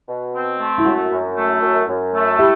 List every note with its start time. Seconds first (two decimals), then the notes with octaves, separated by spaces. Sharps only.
0.09 B2
0.34 C4
0.59 A3
0.78 E4
0.85 F#2 F#4
1.11 F#2
1.37 A3
1.62 F#2
1.88 F#2
2.14 A3
2.39 E4 G4